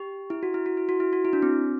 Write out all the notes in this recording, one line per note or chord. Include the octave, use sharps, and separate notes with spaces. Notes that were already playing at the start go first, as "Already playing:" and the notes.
Already playing: G4
E4
F#4
E4
F#4
E4
F#4
E4
F#4
E4
D4
C4